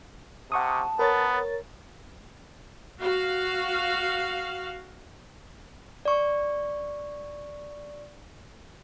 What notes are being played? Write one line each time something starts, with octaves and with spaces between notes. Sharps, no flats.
C3 F#5 A5 C#6 D#6
B3 A#4 C#5 A6
F#4 F5
D5 C#6